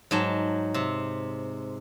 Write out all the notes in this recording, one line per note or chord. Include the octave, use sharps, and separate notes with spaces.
G#2 F#3 A5
C3